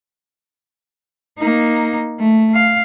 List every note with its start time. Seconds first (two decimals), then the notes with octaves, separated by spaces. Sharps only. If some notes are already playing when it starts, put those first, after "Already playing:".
1.38 A#3 D#4
2.19 A3
2.54 F5